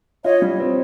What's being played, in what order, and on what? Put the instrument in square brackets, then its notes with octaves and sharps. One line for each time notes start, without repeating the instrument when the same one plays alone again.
[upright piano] F4 [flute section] C#5 D#5
[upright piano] G3
C4